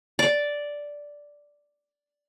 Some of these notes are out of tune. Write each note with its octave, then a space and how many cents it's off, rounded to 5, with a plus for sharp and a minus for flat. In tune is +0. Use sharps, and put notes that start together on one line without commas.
D5 -5